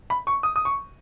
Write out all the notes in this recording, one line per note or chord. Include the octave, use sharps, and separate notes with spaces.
B5
C#6
D#6
D#6
C#6